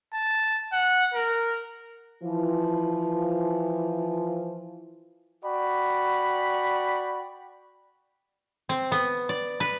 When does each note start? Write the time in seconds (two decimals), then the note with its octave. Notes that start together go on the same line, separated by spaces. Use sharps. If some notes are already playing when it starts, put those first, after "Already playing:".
0.13 A5
0.73 F#5
1.14 A#4
2.23 E3 F3
5.45 F#4 D5 G5 B5
8.69 C4
8.92 B3
9.29 D5
9.60 B4